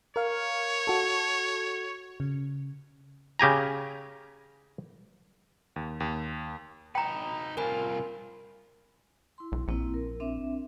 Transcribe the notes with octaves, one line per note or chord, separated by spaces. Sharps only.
A#4 C#5 F5
F#4 A4
C#3
C#3 G4 G#5 A#5
D#2
D#2
D#4 B4 G5 A#5
C2 F4 A#4 G#5 B5
E4 C6
B1
A#1 A#3 C4 E4
A#4
C4 D4 E5